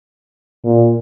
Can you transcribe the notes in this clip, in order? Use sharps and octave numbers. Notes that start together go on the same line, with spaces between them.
A#2